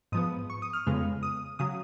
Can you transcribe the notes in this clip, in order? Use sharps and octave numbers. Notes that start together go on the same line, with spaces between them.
G#2 F3 B3 D#6
C#6
D#6
F6
F2 C#3 G#3 B3
D#6
C#3 F#3 D#6